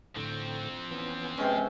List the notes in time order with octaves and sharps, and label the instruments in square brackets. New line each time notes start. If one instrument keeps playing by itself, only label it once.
[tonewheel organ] A2 D3 C#6 [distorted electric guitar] F3 C4
[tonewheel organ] E3 B3 C#4
[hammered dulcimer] C3 G#3 C#4 [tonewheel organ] B3 [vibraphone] B4 G5